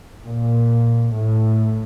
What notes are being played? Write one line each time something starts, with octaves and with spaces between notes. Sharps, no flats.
A#2
A2